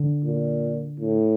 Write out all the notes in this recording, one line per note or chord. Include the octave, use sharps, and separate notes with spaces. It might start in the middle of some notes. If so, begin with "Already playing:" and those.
Already playing: D3
A#2
A2